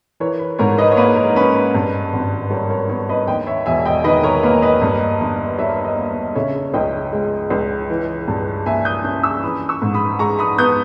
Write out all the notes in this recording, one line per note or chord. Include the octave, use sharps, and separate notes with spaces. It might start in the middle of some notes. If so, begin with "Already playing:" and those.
E3 A#4 C#5
B4
G#2 A#4 C#5
B4 D#5
C#5
A#3 B4
A#4
C#4 B4
B4
G2
G#1
G3 A#4 C#5
A#4 C#5
B3 A#4 C#5
B4 D#5
D#2 D#5 G5
C#5 E5
E1 E5 G#5
D#5 G5
D#3 B4 D#5
A#4 C#5
A#3 B4
B4 D#5
G2
G1
G3 C#5 E5
B4 D#5
A#3
C#3 C#5 E5
C#2 D#5 G5
G#3
C#2
E3
G2
A#3 E5 G#5
D#6 G6
C#4 D#6 G6
C#6 E6
E3 B5 D#6
C#6 E6
G#2
B5 D#6
G#3 A#5 C#6
B5 D#6
B3 D#6 G6